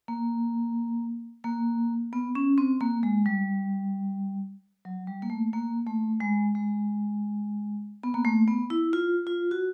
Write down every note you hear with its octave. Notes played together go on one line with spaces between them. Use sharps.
A#3
A#3
B3
C#4
C4
A#3
G#3
G3
F#3
G3
A#3
A3
A#3
A3
G#3
G#3
B3
A#3
A3
B3
E4
F4
F4
F#4